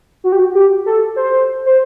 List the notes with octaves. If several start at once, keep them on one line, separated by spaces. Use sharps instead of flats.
F#4
G4
F#4
G4
A4
C5
C5